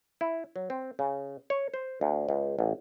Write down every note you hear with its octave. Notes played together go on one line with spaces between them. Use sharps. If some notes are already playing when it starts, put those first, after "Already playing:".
E4
F#3
C4
C#3
C#5
C5
D2
C#2
A1